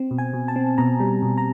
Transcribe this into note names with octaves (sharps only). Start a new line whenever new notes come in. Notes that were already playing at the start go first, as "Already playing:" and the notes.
Already playing: C4
B2
G#5
B2
A5
C4
B2 A#5
G3
B2
A#5